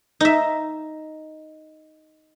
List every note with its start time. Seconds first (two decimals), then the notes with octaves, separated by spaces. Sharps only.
0.21 D#4 E5